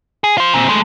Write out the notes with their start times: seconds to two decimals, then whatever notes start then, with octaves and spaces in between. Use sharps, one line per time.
0.24 G#4
0.38 F4 C5
0.53 A#2 C4
0.69 G#3 A3